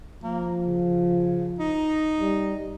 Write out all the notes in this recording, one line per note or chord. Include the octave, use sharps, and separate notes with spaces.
F3 A#3
C#3
D#4
G3